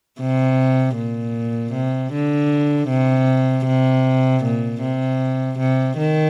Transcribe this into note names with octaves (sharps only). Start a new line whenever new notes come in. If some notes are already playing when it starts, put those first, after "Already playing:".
C3
A#2
C3
D3
C3
C3
A#2
C3
C3
D#3